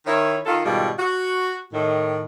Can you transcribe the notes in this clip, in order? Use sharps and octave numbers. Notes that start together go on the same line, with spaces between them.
D#3 E4 C#5
D#3 F4 A4
G#2 B2 D#3 G3 F4 D5
F#4
A2 D#3